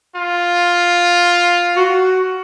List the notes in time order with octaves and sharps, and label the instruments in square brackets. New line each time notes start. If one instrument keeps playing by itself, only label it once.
[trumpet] F4
[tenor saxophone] F#4